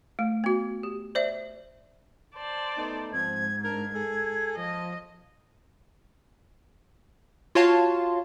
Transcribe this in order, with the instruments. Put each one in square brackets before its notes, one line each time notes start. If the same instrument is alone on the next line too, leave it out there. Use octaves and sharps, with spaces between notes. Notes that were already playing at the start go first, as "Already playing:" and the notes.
[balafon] A3
B3 F#4
G4
C5 D5 E5
[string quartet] C5 D5 A5
[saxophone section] A3 B3 D#4
[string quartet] G#2 [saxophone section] F3 C4 [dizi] G#6
[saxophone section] D4 A#4 [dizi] G#6
[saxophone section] G#4 A4
[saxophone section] F3 [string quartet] D#5
[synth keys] F4 F#4 C#5 F5 A5 C6